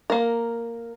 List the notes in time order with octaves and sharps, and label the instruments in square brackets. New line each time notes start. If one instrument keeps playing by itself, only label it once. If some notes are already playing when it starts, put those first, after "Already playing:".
[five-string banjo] A#3 A#4